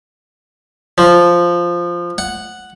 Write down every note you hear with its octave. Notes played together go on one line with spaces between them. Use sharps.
F3
F#5